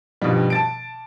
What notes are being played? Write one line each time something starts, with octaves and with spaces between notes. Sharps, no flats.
G2 B2 D#3 F3 G3
A5 A6 D7